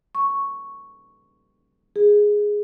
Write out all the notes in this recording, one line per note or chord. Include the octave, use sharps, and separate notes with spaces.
C#6
G#4